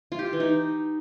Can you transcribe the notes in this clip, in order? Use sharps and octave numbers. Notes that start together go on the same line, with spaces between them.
F4
G4
F4
E3
D#4